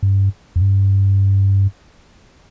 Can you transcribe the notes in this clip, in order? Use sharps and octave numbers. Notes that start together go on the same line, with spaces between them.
G2
F2
G2